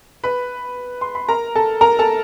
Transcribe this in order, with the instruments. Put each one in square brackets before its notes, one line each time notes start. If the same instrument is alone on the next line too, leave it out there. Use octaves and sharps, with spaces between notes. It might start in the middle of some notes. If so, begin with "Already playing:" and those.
[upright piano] B4 B5
C6
B5
A#4 A#5
A4 A5
A#4 A#5
A4 A5